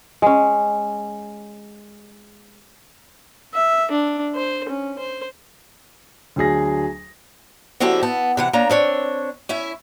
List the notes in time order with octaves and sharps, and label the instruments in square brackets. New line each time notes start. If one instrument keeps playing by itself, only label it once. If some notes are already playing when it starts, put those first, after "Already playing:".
[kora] G#3 C#4
[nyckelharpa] E5
D4
C5
C#4
C5
[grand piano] D2 F#3 G#4 A#6
[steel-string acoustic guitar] D3 F#3 C4 E4 G4 A4
B3 A5
C3 E3 F#5
A#3 C#4 D4 A#5
C4 D4 C#5
C#4 E4 E5